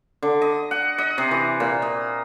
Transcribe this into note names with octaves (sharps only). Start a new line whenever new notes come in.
D3
D#5
F#5
D#5
C3
E3
A#2
D#5